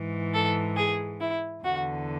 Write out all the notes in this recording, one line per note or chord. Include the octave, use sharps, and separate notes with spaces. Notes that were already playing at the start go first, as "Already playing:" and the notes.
Already playing: G#2 E3
A4
G#4
E4
E2 D3 F#4